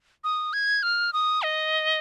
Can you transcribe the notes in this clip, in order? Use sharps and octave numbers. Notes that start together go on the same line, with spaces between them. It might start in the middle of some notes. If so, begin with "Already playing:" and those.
D#6
G#6
F6
D#6
D#5